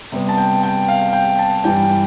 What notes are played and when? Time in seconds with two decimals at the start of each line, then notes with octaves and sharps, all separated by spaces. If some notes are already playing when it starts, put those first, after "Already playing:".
0.12 C3 G3 B3
0.29 A5
0.37 G5
0.63 G5
0.88 F5
1.13 G5
1.39 A5
1.64 G2 E3 G3 G5